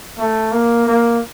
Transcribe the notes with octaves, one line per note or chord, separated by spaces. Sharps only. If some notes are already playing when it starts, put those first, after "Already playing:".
A3
A#3
A#3